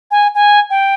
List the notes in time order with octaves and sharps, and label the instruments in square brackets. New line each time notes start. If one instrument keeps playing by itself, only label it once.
[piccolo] G#5
G#5
G5